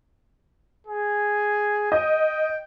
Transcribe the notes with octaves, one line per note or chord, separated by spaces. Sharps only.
G#4
D#5 G5